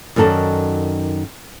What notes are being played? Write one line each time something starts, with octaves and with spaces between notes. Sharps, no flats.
F#2 D#3 F#4 A4 D5 D#5